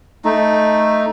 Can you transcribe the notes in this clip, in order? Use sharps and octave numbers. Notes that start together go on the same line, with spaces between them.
A3 D#4